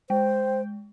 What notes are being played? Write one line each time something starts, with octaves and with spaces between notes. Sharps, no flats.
G#3 C5 G5